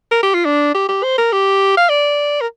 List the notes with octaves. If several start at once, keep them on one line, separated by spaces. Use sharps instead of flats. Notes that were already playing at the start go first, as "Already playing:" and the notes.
A#4
G4
F4
D4
G4
G4
C5
A#4
G4
F5
D5
A#4